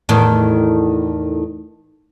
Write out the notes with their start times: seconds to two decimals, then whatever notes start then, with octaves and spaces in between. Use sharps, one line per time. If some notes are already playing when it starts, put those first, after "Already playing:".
0.09 E2 A2 D#3